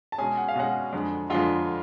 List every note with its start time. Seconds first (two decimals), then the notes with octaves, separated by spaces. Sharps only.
0.12 A5
0.18 B2 G#3 C#4 G#4 G#5
0.37 F#5
0.48 F5
0.55 B2 G#3 C#4 F#4 F#5
0.93 F2 D3 G#3
1.30 F2 D3 G#3 F4 F5